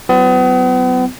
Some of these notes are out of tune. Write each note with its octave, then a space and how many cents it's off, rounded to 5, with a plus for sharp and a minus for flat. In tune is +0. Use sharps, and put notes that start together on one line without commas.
F#3 +35 B3 +40 F4 -35